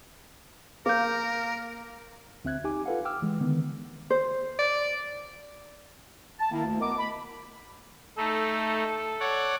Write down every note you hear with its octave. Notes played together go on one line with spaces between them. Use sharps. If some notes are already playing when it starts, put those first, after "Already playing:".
A#3 A#4 D6 G6
D2 C4 E5 F#6 G#6
D#4 G4 G#5 D6
F4 A4 B4 F5 F#5
G5 D6 E6 F6
E3 G#3
D3 D#3 B3
C5
D5
A5
D#3 A#3 E4
D2
B3 A#4 D#5 D6
B5
A3 D#4 A4
C#5 D5 F#5